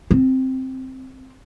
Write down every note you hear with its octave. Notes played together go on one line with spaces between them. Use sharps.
C4